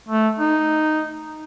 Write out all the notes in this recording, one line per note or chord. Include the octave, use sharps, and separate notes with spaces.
A3
D#4